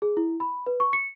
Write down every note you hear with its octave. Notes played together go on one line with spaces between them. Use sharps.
G#4
E4
B5
B4
C#6
C#7